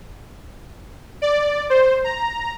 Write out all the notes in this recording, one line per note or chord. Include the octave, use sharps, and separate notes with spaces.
D5
C5
A#5